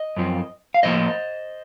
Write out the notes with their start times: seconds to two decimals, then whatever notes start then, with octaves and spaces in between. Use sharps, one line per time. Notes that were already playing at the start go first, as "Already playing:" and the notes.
Already playing: D#5
0.17 F#2 F3 C4
0.74 F5
0.83 A2 F3 A#3 C5 D#5